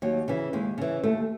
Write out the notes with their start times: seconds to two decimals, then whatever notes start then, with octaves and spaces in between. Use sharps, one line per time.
0.02 D#2 F#3
0.28 C#3 E3
0.53 D#2 G#3
0.78 C#3 E3
1.03 D#2 A3